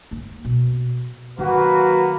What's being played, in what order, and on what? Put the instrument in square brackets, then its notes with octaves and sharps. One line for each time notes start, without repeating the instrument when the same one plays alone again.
[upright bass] A#3
B2
[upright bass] D#3 [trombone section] F#3 F#4 [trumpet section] A#3 B4